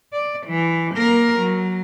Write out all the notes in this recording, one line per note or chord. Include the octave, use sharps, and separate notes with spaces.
D5
E3
A#3 A#4
F#3